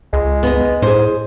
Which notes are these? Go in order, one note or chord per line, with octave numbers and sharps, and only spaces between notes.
C#2 G#3
B3 D#4 D#5
A2 G#4 C5